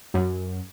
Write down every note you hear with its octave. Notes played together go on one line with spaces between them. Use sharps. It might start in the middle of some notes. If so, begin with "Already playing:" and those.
F#2